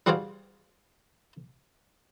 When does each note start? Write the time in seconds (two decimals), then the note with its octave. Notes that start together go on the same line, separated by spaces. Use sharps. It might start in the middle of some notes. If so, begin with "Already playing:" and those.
0.06 G3 F#4 G#4 C5 D5 F5